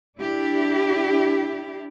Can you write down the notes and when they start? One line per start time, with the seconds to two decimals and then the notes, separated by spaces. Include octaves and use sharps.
0.18 D4 E4 G4